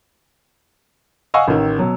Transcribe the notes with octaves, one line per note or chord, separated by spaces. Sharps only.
D#5 F5 F#5 G#5 C#6 E6
A1 D#3
B2 F#3